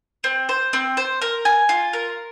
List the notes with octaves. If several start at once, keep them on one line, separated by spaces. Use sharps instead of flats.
C4
C5
C4
C5
A#4
G#5
F4
A#4